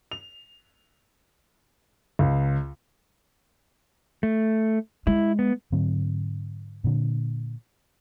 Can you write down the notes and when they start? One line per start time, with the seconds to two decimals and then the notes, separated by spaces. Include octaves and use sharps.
0.12 F7
2.19 C#2
4.23 A3
5.07 G#3 E4
5.39 B3
5.72 G#2 D3 F#3 C4
6.84 A#2 D3